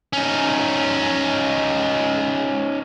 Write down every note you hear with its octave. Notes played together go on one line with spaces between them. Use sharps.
C#4 D#4